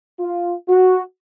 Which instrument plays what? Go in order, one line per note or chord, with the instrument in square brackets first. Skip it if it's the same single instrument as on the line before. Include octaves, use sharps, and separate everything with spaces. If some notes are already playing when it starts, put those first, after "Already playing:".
[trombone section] F4
F#4